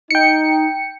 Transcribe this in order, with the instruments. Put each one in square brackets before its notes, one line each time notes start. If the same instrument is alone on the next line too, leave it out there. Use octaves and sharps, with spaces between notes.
[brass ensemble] D#4 [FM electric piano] G5 C#7